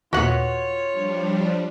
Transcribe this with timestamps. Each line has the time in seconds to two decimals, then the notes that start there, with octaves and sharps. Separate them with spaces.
0.13 D#2 A#2 F4 F#4 B4 C#5 F#5
0.91 F3 G3 D4